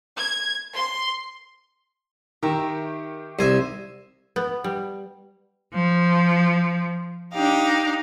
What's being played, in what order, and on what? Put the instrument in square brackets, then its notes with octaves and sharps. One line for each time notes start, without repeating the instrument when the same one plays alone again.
[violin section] G#6
C6
[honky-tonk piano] D#3 [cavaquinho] G4 E5 A#5
[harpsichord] C2 G#5 [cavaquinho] C5 E5
[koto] B3
G3
[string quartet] F3
D4 D#4 G4 F5